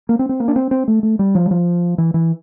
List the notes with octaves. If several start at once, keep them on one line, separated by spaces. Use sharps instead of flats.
A#3
C4
C4
A#3
D4
C4
C4
A3
A3
G3
F3
G3
F3
E3
E3